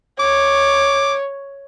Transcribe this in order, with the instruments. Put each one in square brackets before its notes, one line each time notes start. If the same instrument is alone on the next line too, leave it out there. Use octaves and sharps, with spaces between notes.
[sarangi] C#5 [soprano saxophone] D6